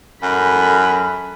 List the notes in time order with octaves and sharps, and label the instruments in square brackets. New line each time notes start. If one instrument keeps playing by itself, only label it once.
[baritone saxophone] F#2 [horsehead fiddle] A4 B5